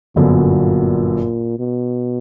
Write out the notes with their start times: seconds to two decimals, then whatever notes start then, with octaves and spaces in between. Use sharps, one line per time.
0.16 G1 F#2 A#2 D3 F#3 B3
1.59 B2